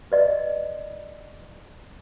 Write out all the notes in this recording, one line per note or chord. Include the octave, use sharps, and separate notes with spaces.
B4 D5 D#5